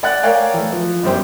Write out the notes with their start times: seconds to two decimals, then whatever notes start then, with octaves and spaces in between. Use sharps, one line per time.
0.03 D5 F#5 F#6 A6
0.23 A#4 C#5 D5 F5 G5 G#5
0.54 E3 A3
0.73 F3
1.03 G1 F#2 G3 C5 G5